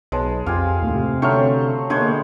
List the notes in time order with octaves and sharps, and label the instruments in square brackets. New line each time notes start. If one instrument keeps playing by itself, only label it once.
[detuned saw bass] B1 [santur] G#3 [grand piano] B4 C#5 A5
[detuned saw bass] F2 [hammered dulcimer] F4 G4 G#5 [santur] F5 [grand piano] D6
[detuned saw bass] D#2 [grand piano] A2
[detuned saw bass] C3
[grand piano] D3 C#4 F6 [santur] F#3 C5 C#6 [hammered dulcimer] A3 G5
[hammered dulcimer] B2 [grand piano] D3 B5 [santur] G#3 C5 C#5 [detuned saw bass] A#3